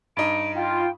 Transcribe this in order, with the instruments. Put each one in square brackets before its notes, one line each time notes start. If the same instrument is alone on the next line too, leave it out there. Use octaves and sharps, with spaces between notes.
[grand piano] G2 D#4 [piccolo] D7
[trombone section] F4 [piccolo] G5